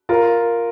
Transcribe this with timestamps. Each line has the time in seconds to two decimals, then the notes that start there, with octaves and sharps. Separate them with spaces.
0.09 F4 A#4